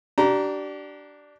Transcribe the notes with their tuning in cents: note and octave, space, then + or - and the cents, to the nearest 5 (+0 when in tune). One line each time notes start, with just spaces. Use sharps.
D4 +0 G4 -35 A#5 +0